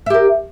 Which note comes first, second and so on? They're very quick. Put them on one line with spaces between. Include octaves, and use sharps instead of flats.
E5 G4 A#4